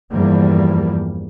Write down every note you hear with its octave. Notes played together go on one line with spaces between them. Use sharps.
E2 G2 F3 G3 A#3